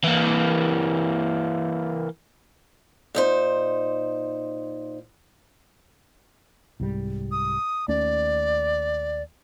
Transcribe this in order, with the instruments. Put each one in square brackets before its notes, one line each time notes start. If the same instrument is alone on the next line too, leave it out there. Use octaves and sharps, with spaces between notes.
[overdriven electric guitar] E3 A#3
[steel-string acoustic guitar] A#2 D#4 C5
[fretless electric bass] C2 G#2 G3
[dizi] D#6
[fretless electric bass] D#2 A3 C#4 [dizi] D5